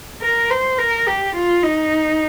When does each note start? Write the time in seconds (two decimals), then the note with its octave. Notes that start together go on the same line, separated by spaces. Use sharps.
0.22 A#4
0.50 C5
0.78 A#4
1.07 G4
1.35 F4
1.63 D#4